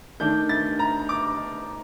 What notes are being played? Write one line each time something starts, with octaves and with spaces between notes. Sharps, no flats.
D#3 A3 D4 G6
A6
A#5
D6